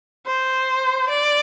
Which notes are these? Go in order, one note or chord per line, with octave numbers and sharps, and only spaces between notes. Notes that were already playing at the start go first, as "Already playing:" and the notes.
C5
D5